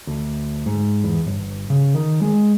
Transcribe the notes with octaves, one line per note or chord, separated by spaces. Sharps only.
D2
G#2
E2
G1
C#3
D#3
G#3